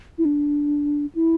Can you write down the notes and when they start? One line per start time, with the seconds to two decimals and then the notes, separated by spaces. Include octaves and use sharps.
0.18 E4
0.25 D4
1.15 E4